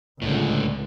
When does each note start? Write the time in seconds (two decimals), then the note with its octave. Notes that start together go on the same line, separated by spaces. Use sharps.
0.22 C#2 A2 D3